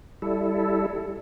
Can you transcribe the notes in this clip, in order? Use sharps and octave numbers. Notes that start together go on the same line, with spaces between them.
G3 E4 A4